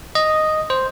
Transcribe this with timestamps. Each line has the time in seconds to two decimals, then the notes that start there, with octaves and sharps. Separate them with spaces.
0.15 D#5
0.70 C5